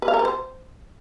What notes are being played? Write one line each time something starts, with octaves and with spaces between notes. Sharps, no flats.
B4
F5
A#4
B4
C5